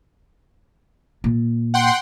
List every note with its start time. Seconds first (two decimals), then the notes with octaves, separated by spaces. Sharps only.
1.24 A#2
1.74 F#5 G5 C6